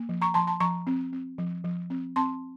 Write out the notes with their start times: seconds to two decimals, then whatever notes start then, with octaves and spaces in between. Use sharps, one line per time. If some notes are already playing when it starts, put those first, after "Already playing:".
Already playing: A#3
0.09 F3
0.22 A#5 C#6
0.34 F3 A5 C6
0.47 A5 C6
0.60 F3 A#5 C#6
0.87 C4
1.13 C4
1.38 F3
1.64 F3
1.90 C4
2.16 C4 A5 C6